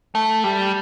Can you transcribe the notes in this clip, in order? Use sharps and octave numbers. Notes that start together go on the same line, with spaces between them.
A3
G3